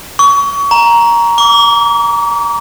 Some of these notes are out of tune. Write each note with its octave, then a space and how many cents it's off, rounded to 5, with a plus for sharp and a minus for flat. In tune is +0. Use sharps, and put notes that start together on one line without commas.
C#6 +30
A#5 +10
D6 -35